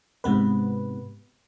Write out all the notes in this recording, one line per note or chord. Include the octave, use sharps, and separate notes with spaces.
G#2 C3 B3 B4